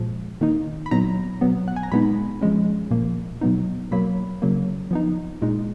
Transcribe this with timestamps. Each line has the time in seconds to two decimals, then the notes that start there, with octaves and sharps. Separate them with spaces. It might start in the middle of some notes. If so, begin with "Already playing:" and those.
Already playing: A#2 F3 G#3
0.41 D#3 A#3 D#4
0.86 B5
0.91 A#2 F#3 B3 D#4 A#5
1.41 B2 F#3 B3
1.68 F#5
1.76 G#5
1.83 A#5
1.92 A#2 G#3 B3 D#4 B5
2.41 F3 G#3 C#4
2.91 A#2 F3 A#3
3.41 B2 F#3 B3 D#4
3.91 B2 F#3 A#3 B5
4.42 C#3 F#3 A#3
4.91 F3 B3 D#4
5.42 A#2 G#3 D#4